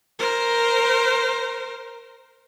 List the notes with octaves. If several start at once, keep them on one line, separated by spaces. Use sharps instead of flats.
A#4 C5